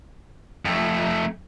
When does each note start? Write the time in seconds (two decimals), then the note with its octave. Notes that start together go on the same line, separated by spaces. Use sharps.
0.65 F2 A3